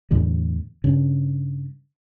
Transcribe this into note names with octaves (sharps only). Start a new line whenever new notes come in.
E2 A2 D3 G3
G2 C#3